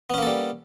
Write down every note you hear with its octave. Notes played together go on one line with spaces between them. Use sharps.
G3 A#3 B3 C#4 A4